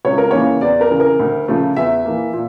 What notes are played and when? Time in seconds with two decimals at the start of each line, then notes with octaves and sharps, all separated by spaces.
0.05 C#2 C#5
0.18 A#4
0.31 C#3 E3 A#3 C#5
0.61 E2 D5
0.81 A#4
0.90 C#3 E3
1.00 A#4
1.19 D2
1.48 C#3 F3 A3
1.76 E2 E5
2.05 E3 A#3
2.33 A#2